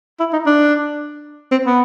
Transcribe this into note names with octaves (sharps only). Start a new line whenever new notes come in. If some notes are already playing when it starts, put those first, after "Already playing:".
E4
D#4
D4
C4
B3